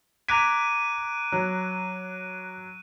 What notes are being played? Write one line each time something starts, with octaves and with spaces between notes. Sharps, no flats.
A#5 D6 F#6 G#6 B6 D7 D#7
F#3